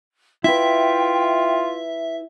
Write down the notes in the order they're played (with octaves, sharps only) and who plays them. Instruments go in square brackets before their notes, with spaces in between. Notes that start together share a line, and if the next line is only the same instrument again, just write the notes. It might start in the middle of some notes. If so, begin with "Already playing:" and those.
[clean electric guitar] E4 B4 [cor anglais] F4 [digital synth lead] E5 [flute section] G5